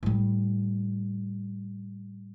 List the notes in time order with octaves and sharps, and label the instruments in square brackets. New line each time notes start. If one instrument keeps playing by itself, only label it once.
[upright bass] A2 G3